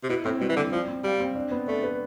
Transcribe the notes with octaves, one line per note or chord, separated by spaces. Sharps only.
C3
B2 E4
A2 C4
B2 G3
E3
D3 C4
F3 D5
C4
G3 F5
C4
D4
B3
A3 D4
B4